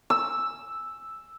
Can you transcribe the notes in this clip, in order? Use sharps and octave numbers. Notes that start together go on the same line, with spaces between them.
E6